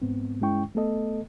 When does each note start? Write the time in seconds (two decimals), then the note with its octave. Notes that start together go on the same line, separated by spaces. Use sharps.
0.02 G#2 B3 C4
0.41 G2 G#3 C#4 E4 G5 C#6
0.75 A3 B3 A4 D#5